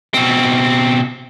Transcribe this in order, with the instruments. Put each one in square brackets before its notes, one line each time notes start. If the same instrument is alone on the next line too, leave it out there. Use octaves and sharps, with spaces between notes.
[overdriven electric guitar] B2 C4